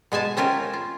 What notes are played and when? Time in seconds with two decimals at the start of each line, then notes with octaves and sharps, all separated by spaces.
0.12 B2 G#3 G#5 A5
0.37 C4 C#4 F4 A#4
0.73 F4